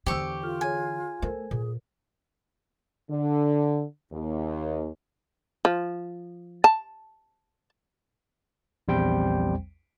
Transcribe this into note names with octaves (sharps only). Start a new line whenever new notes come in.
E2 D3 G4 C5 C#6 D#6 E6
F4 A4 F6
G#4 C#5 G#5
A3 A4 A#4 C5
A#2 G#4
D3
D#2
F3
A5
A#1 E2 G3 C4 C5 G5